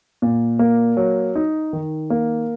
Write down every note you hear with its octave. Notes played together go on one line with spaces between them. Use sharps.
A#2
A#3
F#3
D#4
D#3
A#3